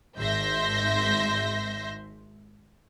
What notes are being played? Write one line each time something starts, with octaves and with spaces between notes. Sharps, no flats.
G#1 G#2 E5 C6 G6 A#6